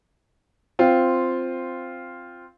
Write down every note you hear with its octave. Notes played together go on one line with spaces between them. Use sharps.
C4 F4